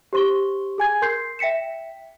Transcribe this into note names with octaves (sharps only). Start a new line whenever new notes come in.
G4 C5 C6 C#6 G7
G#4 G#5 G#6
A#4 C6 G6 C7
E5 G5 B6 C#7 E7